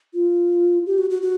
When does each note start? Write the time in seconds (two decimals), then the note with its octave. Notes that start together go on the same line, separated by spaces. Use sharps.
0.14 F4
0.86 G4
0.98 F#4
1.10 F#4
1.22 F#4